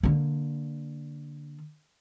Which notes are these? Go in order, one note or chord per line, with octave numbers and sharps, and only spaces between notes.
D3 A#3